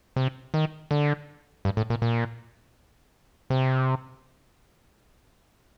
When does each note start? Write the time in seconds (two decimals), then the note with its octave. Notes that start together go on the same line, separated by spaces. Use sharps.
0.16 C3
0.54 D#3
0.91 D3
1.65 G2
1.77 A2
1.90 A#2
2.02 A#2
3.50 C3